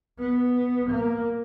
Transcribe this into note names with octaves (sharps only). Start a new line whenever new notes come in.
B3
A#3